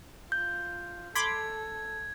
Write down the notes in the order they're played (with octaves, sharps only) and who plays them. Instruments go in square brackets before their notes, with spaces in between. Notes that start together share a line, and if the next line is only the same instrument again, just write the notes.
[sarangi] F4 [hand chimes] G6
[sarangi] A4 [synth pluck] B5 C6 D6 [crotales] G#6